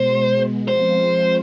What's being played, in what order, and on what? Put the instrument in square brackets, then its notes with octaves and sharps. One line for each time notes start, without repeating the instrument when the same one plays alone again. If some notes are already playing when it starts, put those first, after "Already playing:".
Already playing: [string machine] B2 G#3 B3 [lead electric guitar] C5
[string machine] F3 G#3 C4 F4 [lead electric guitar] C5